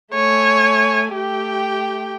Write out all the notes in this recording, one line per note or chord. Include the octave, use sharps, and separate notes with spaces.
A3 C#5 G#5
A3 G4 G5